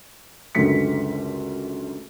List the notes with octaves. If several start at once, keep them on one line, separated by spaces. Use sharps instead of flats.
C#2 F#2 D3 A3 B6 C#7